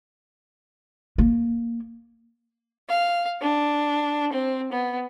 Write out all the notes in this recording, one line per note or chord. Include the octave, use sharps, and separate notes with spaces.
A#3
F5
D4
C4
B3